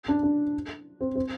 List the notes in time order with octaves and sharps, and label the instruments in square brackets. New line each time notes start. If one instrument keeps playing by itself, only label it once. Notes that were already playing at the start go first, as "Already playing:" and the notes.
[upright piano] D4
D4
C4
C4